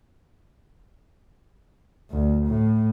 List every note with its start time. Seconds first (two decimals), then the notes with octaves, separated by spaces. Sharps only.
2.11 D2
2.47 A2